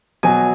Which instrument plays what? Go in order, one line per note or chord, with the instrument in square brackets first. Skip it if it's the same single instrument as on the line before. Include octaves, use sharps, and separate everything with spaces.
[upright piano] B2 F#3 G#5